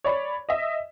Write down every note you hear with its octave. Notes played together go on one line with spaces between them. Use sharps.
C#5 D5 B5
D#5 E5